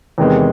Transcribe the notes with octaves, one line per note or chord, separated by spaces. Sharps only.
E2 C3 D#3 G#3 B3